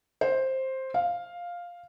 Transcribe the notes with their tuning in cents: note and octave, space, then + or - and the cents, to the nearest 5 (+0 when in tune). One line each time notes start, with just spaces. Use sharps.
C5 +10
F5 +5